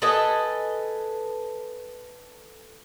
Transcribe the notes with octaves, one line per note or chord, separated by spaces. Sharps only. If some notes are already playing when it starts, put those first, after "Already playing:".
A4 B4 D#5 G#5